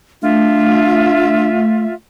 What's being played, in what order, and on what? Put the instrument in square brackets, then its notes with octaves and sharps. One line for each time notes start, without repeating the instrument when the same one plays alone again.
[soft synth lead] A3 [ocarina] D4 [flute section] F4 E5